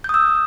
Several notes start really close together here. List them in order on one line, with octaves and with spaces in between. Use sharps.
G6 D#6 E6